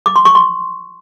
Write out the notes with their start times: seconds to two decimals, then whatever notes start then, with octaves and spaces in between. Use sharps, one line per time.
0.06 D6
0.16 C6
0.25 C#6
0.35 C6